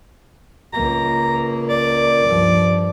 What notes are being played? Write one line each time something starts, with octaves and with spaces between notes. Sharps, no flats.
C#2 A#3 A#5
D5
G2 F3